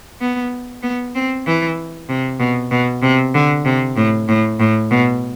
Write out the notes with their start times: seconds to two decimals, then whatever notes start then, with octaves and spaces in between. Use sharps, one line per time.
0.21 B3
0.83 B3
1.15 C4
1.46 E3
2.09 C3
2.40 B2
2.71 B2
3.02 C3
3.35 D3
3.65 C3
3.97 A2
4.29 A2
4.60 A2
4.91 B2